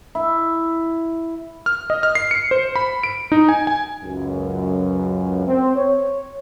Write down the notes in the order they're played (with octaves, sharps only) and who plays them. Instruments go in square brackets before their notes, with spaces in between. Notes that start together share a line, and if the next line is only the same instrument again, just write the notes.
[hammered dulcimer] E4
[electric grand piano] F6
D#5
F6
C7
C#7
C5
B5
D7
D#4
G#5
G#5
[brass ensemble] C#2 F#2
C4
C#5